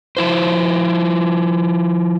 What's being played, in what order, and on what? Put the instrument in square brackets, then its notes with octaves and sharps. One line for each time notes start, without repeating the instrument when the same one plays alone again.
[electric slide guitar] F3 E4 C5